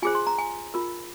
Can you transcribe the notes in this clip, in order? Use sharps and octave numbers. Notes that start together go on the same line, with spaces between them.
F4 G#4 C5 G#5
C6
A#5
G#5
F4 A#4